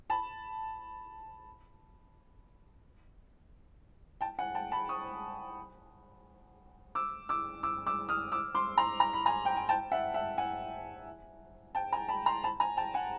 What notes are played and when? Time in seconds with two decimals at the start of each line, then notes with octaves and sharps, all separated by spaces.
0.10 A5 B5
4.21 G5 A5
4.39 F#5 G#5
4.55 G5 A5
4.72 A5 B5
4.89 C#6 D#6
6.95 D6 E6
7.29 D6 E6
7.63 D6 E6
7.87 D6 E6
8.09 D#6 F6
8.32 D6 E6
8.55 C6 D6
8.78 A#5 C6
9.00 A#5
9.13 B5
9.26 G#5 A#5
9.45 G5
9.56 G#5
9.69 G5 A5
9.92 E5 F#5
10.14 E5 F#5
10.38 F#5 G#5
11.75 G5 A5
11.93 G#5 A#5
12.09 A5 B5
12.26 A#5 C6
12.44 A5 B5
12.60 G#5 A#5
12.77 G5 A5
12.94 F#5 G#5